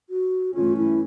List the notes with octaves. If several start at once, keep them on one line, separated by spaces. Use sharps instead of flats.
F#4
G2 E3 A3 C#4 F4
E4